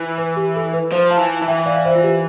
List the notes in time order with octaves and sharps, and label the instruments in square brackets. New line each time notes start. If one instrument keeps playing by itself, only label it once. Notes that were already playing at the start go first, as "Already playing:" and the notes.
Already playing: [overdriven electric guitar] E3
[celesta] B4
G4
A4
B4
[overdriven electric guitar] F3 [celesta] C5
[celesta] F5 A5
[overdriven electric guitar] E3
E3
[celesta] E5 G5
D5 F5
F5
C5 E5
F4
G4